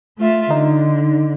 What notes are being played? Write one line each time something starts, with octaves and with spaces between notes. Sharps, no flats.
A3 F4 E5
D3 D#4